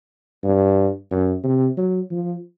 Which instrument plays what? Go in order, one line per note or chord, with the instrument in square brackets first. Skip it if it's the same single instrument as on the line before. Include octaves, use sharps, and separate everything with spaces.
[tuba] G2
F#2
C3
F#3
F3